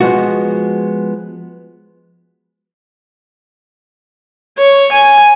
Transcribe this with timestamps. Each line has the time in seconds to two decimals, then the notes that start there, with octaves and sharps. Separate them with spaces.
0.01 F3 G#3 B3 F#4
4.58 C#5
4.92 G#5